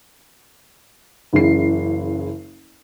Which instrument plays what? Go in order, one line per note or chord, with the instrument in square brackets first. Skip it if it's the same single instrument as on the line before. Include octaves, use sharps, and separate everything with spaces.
[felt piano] F#1 C#3 E3 C7